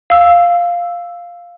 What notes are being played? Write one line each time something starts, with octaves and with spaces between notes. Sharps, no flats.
F5 E6